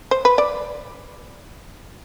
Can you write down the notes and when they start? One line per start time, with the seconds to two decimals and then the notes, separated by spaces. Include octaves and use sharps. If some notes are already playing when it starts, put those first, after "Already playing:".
0.11 C5
0.25 B4
0.38 D5